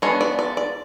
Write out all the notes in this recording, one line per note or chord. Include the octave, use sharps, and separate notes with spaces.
G#3 B3 D4 C#5
D5
D5
D5